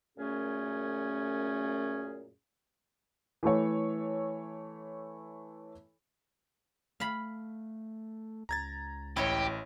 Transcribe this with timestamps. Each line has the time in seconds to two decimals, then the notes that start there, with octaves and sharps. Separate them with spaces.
0.18 F#2 A#2 A3 C#4 G#4
3.43 E3 A3 A4 C#5
7.00 A3 F5 B5
8.49 C#2 A#5 G#6 A6
9.16 A1 E4 G4 C#5